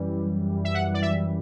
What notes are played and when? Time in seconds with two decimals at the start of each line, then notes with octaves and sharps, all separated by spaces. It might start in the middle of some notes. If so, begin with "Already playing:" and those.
Already playing: F#2 E3 G3
0.64 E5
0.74 F#5
0.94 D5
1.02 E5